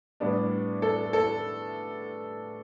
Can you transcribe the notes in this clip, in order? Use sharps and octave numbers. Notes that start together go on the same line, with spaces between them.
A2 G3 B3 D4
A4
A4